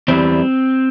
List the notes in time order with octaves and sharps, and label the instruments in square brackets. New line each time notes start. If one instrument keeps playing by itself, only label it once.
[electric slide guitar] E2 E3 G3 C4